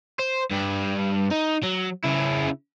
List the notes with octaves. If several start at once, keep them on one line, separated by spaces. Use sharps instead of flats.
C5
G2 G3
D#4
F#3
C#3 E4